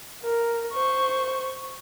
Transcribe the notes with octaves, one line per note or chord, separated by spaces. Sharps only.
A#4
C5 C#6